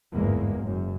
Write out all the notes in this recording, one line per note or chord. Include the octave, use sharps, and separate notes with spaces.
G1 E2 G#2 G#3 A#3
F#1 F#2